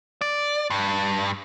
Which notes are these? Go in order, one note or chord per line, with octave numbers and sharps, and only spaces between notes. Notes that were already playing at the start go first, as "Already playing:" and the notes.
D5
G2